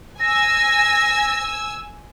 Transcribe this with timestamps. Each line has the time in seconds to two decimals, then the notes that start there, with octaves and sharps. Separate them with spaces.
0.20 G#5 E6 A#6